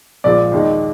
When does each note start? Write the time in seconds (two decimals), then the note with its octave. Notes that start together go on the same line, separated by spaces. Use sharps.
0.24 A#1 A#2 F3 G#3 D5
0.52 D#2 D#3 G#3 D#4